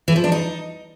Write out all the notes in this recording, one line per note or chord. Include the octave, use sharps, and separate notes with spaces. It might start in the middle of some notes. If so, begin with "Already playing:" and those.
E3
F3
D4
D#4